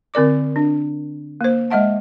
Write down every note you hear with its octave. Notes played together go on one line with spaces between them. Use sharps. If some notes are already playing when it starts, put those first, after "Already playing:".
D3 C4 A#4 D5 D6
D4
A#3 C5
G#3 D#5 E5 F#5 A5